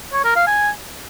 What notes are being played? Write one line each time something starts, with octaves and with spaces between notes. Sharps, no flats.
C#5
A#4
F5
G#5